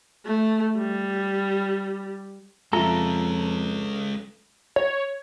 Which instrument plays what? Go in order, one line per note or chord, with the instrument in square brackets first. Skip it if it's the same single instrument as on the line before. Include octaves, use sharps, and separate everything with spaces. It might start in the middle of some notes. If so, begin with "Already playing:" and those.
[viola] A3
G3
[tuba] F2 [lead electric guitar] G#3 C#4 [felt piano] F4 E5 [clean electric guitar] A4 A#5
[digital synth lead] C#5